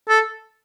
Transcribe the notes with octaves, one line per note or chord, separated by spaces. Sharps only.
A4